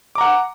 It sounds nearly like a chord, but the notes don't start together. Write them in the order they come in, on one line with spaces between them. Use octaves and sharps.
D6 A#5 F#5